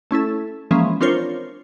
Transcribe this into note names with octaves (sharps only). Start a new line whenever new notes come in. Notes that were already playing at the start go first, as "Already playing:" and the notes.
A3 C#4 E4 A4
E3 F3 G#3 A#3 C#4
C4 D4 F4 A#4 C5 C#5